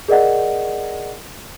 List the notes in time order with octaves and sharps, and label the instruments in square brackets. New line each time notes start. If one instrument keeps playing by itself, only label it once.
[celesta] G#4 A#4 D5 D#5 F#5